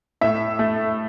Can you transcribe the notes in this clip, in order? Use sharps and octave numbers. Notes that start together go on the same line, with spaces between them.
A2 E5
A3